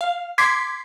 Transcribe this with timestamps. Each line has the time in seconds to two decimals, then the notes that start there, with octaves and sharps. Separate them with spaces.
0.01 F5
0.38 C6 D6 G#6 B6 C7